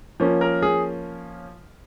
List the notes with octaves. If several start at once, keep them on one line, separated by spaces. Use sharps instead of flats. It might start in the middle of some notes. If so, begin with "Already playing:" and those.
F3 A#3 C#4
A#4
G#4